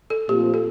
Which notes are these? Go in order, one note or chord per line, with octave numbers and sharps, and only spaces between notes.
A4
A#2 F3 A3 C4 F4 G4
A4